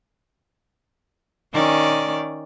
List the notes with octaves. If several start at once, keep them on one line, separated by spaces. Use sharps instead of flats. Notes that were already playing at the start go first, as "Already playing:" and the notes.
D#3 C#4 D5